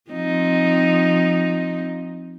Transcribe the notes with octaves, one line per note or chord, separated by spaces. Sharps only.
F3 C4 D#4